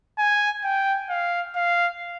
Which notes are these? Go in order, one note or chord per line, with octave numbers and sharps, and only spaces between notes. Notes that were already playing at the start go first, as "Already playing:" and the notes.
G#5
G5
F5
F5